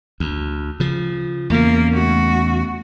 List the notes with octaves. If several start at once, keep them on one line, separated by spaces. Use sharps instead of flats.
D2
C#3 F3
E2 C#3 A#3
A3 F#4